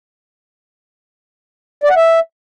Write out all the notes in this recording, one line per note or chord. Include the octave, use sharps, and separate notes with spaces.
D5
F#5
E5